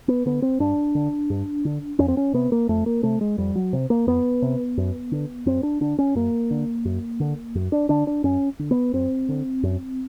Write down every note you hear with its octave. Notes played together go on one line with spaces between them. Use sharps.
B3
D3 B3
C4
G2 D4
D3
G2
D3
F2 C#4
C4
C#4
C3 B3
A#3
F2 A3
A#3
C3 A3
G#3
F2 G3
F#3
C3
A#3
F2 B3
C3
F#2
D3
F#2 C4
D4
D3 D4
C#4
F#2 A#3
D3
F#2
D3
F#2
D4
D3 D4
D4
F#2 C#4
D3
B3
F#2 C4
D3
F#2